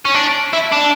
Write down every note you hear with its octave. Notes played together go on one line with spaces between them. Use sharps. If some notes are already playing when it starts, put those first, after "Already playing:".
C#4
D4
E4
D4